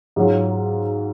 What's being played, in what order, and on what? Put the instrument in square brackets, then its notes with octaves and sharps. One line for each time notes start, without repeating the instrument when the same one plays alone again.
[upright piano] G#2 F#3 C#4 F4